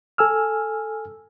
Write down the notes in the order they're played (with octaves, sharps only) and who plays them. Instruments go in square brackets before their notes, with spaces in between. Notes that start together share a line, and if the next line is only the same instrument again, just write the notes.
[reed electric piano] A4 G#5 E6 F6